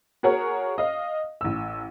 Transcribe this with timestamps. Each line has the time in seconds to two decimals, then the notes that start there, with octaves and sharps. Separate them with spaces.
0.23 F#4 G#4 A#4 C#5 F#5
0.78 D#5 F5
1.41 A1 E6